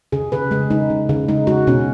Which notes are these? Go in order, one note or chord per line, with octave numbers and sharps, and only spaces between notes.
C#3 G#4
C#3 B4
G#3 G#4
G#3 D#4
C#3
C#3
G#3 D#4
G#3 F#4
B2 C#4